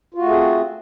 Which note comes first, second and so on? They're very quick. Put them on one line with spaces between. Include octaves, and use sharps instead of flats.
F4 F#4 A3 G#4 C4